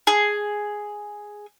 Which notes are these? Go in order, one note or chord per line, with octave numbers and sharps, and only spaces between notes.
G#4